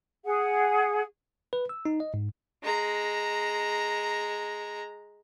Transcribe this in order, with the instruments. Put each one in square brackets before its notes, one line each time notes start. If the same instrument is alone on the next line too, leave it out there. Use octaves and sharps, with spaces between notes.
[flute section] G#4 F#5
[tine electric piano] B4
E6
D#4
D#5
G#2
[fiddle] G#3 A#5